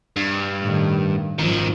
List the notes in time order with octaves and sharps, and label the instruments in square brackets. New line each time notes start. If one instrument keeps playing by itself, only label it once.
[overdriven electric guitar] G2
[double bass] A2 D#3
[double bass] G#1 F3 [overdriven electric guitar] F#2 D#3